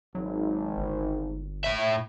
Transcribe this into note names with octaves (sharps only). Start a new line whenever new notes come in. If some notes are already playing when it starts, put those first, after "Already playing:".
G#1 F#3
G1
A2 E5